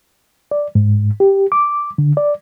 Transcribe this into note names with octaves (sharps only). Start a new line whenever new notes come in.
D5
G#2
G4
D6
D3
D5